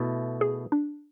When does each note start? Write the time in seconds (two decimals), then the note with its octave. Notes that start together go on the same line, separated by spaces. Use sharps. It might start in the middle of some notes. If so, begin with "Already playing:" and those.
Already playing: B2 A3 E4
0.41 G#4
0.72 D4